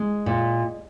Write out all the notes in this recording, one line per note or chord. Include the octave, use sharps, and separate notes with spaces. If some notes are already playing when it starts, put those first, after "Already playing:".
Already playing: G#3
A#2